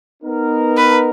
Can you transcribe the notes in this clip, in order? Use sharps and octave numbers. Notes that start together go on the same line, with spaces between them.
B3 D#4 A#4
B4